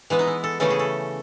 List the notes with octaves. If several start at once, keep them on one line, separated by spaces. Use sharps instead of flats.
E3 G#3 B3 E4
D#4
E4
A4
C#3 E3 A3 C#4 A4
G#4
A4